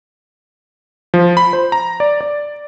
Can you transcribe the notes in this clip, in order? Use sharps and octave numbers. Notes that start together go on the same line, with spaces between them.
F3
B5
C5
A#5
D5
D5